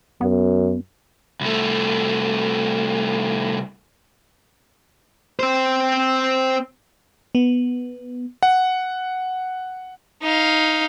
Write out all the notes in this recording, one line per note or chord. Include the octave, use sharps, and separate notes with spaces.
F#2 B3
C2 A3
C4 C5
B3
F#5
D#4 F5